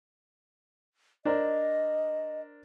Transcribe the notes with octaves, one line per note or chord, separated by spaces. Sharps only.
D4 A#4 C5 D#5